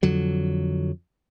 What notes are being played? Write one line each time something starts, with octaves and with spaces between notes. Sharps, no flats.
F2 D3 F#3